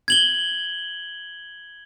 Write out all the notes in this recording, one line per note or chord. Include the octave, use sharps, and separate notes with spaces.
G#6 F#7 G7